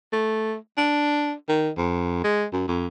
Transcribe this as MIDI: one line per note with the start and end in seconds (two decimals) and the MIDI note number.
0.13 0.56 57
0.77 1.33 62
1.49 1.70 51
1.77 2.22 41
2.24 2.45 56
2.53 2.65 42
2.68 2.87 41